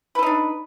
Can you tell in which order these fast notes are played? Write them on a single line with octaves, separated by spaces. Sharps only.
B4 A4 D#4 D4